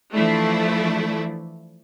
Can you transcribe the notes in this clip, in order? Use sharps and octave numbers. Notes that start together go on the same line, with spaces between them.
E3 F3 A3 D4 E4